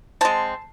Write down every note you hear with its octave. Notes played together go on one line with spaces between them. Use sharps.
G#3 C4 A5